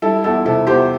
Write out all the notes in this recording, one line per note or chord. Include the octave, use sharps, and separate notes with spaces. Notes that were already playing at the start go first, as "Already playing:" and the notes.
G3 E4 A4
E2 E4 A4
C3 E4 A4
E2 G4 C5